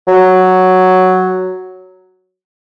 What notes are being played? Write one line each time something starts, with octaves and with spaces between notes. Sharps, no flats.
F#3